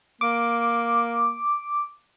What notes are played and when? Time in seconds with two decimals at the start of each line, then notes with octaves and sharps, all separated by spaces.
0.21 A#3 D6